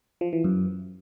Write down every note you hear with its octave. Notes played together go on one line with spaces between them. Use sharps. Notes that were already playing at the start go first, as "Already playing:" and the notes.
F3
E3
F#2